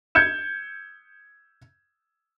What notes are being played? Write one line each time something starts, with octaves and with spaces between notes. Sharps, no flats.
G6 G#6 C#7 E7